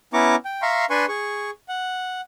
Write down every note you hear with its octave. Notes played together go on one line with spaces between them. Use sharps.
B3 C#4 E4 A#5 C#6 D6
G5
E5 F5 A#5 C6 C#6
D4 B4 G#5 C6 C#6
G#4 C#6
F#5